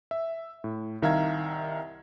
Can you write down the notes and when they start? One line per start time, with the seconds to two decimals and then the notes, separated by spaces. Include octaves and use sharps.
0.11 E5
0.64 A2
1.02 C2 D#3 E5 F5 A#5 G#6